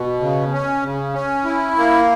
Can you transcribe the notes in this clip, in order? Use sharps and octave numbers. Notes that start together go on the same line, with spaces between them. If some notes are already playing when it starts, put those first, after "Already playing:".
Already playing: B2
C#3
C#4
C#3
C#4
E4
A#3